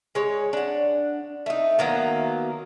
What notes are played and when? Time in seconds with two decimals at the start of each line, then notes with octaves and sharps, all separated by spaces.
0.15 G#3 C#5
0.53 D4 F#5
1.46 A3 D#4
1.79 D#3 F#3 A#3 B3